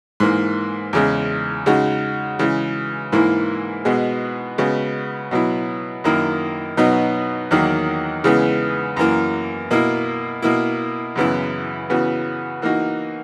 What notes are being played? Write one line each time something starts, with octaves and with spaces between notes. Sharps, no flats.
G#2 E3 A#3
E2 C#3 G#3
C#3 G#3 D#4 F#4
C#3 E3 G#3
G#2 E3 A#3 E4
B2 G#3 B3 F#4
C#3 G#3 B3 F#4
B2 F#3 B3 E4
F#2 D#3 A#3 E4
B2 F#3 B3 D#4
E2 D#3 F#3 A#3
C#3 E3 G#3 B3
F#2 E3 A#3
B2 A#3 E4
B2 A#3 E4
F#2 C#3 E3 B3 E4
C#3 E3 B3 F#4
E3 A#3 D#4 F#4